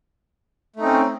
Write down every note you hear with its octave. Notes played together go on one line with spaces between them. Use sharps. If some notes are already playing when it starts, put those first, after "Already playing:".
A3 C4 C#4 D#4